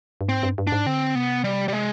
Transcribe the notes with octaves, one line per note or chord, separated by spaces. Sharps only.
G2
G#2 C4
G2
G2
G#2 D4
D3 C4
C3 B3
G3
G3
G#3